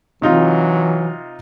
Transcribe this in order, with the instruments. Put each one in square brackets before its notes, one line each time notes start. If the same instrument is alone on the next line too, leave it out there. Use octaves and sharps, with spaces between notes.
[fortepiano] C3 D#4 F4 [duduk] E3 [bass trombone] F#3